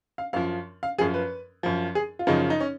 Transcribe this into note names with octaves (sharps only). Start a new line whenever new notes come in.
F5
F#2 F3 F5
F5
F#2 F3 G#4
B4
F#2 F3
G#4
F4
F#2 C#3 F3 D#4
D#4
C#4